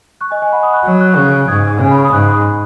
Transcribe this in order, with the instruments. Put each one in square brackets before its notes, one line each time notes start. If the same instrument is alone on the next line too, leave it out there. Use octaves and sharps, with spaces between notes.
[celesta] C#6 F#6
D#5 G#5
D#5 G#5
F#5 B5
B5 D#6
C#6 F#6
[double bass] F#3
[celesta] C#6 F#6
[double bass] C#3 [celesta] C#6 F#6
[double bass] G#2 [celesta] D#6 G#6
[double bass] C#3 [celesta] G#5
[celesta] B5
C#6
D#6
[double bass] G#2 [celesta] C#6 F#6
[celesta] B5 D#6